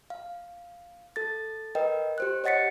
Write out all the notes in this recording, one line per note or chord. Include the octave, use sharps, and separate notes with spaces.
F5
A4 A6
A#4 B4 D#5 G5
G4 C5 F#6
C#5 D#5 F#5 A6 B6 C#7